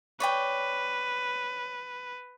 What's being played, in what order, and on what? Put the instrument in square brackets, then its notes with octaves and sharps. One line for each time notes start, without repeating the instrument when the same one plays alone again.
[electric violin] B4 [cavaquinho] C#5 D5 G5